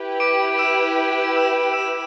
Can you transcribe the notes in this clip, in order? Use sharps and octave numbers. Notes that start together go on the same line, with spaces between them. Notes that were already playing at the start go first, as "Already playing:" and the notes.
Already playing: E4 G4 B4
D6 D7
E6 E7
D7
E6 E7
E6 E7